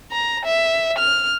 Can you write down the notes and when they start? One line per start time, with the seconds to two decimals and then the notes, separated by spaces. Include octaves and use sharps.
0.12 A#5
0.45 E5
0.98 F6